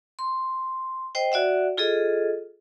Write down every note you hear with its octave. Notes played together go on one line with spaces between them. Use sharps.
C6
C5 D#5 G5
F#4 D5 E5 F#5
F4 G#4 A4 D#5